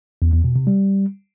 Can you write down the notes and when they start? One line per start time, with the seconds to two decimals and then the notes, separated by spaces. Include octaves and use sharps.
0.22 E2
0.33 E2
0.44 B2
0.56 C3
0.67 G3